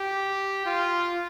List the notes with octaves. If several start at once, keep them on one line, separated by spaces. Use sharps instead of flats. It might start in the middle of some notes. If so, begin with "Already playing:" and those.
Already playing: G4
F4